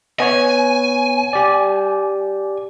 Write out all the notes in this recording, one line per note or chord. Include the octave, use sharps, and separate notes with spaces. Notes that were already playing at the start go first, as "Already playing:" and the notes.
B3 C#5 G#5
G4 D5